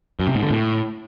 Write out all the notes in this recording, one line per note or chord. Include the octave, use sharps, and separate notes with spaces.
F#2
C3
G#2
D3
A2